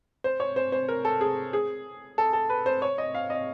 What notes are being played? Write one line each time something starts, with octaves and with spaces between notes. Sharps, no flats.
C5
C#5
C5
C5
A#4
A4
G#4
G#4
A4
A4
B4
C5
C#5
D#5
F5
D#5